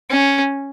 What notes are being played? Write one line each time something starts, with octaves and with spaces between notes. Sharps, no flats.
C#4